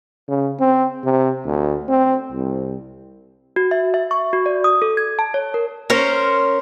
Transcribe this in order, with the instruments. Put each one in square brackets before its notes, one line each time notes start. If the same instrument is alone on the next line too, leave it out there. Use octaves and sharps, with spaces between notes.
[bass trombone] C#3
C4
C3
D2
C4
C2
[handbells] F#4
E5
E5
C#6
F#4
D5
D#6
A4
G#6
A5
C#5
A#4
[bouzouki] C#4 A#4 C5